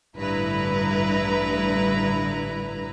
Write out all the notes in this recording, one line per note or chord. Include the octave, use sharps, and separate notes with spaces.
A1 G2 D3 E4 B4 A#5